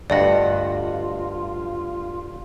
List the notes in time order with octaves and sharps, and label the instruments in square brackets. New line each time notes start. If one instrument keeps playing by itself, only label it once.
[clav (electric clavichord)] D2 G2 F#5 [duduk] F4 [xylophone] D5 D#5